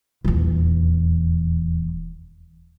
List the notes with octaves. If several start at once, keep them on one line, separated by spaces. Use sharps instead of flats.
D#1 E2